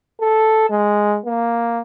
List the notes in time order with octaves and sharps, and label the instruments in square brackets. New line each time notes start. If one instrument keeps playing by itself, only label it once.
[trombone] A4
G#3
A#3